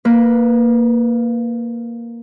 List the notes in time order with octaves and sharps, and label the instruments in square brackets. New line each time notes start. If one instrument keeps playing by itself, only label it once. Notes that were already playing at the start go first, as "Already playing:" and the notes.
[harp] A#3 B4